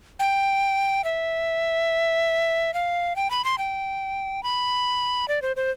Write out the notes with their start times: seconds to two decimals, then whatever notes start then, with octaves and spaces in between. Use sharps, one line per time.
0.19 G5
1.04 E5
2.74 F5
3.16 G5
3.31 B5
3.44 C6
3.58 G5
4.43 B5
5.28 D5
5.42 C5
5.56 C5